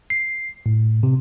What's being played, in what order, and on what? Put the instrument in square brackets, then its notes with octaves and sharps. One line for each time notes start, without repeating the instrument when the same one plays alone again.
[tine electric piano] C7
A2
C3